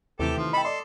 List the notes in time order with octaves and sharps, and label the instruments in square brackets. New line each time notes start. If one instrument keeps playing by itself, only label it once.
[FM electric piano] D#2 [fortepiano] C3 E3 A3 [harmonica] G4 A4
[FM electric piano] D#3 [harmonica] F3
[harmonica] A4 [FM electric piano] D#5 G5 [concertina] B5
[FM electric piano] D5 D#5 [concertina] C6